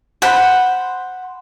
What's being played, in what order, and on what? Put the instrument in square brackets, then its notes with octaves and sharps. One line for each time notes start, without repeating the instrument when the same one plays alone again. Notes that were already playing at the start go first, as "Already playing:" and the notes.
[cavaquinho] C5 F#5 B5